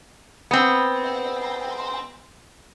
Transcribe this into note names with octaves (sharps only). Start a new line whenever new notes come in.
B3 C4